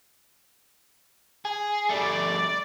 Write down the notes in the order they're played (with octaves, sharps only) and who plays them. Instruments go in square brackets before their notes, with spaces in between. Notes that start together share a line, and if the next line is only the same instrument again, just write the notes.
[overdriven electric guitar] G#4
[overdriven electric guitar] G3 A3 [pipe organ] D5